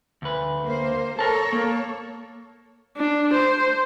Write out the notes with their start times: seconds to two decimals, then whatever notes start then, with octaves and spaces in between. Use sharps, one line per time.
0.22 D2 B4
0.63 A#3 C5
1.19 A4 A#4 C#5 A5
1.53 A#3
2.97 D4
3.33 C5